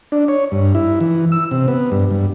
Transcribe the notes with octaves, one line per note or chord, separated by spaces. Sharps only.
D4
C#5
G2
E4
E3
E6
C3
B3
G2
G2